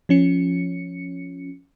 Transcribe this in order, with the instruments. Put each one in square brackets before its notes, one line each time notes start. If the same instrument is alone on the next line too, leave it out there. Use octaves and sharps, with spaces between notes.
[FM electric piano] F3 C#4 C#7